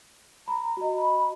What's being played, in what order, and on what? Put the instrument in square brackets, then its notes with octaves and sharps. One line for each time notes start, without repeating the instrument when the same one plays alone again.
[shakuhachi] A#5 [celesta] B5
[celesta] F#4 D#5
[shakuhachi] B5